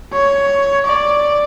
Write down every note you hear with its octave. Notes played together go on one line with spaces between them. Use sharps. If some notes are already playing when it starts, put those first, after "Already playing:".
C#5
D5